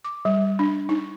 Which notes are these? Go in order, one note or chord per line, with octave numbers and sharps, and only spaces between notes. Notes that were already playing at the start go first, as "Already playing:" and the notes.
D6
G3
D4
D#4